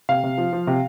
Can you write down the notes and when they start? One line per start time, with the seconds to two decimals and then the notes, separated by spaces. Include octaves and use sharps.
0.09 C3 F5
0.24 C3
0.38 F3
0.53 F3
0.67 C3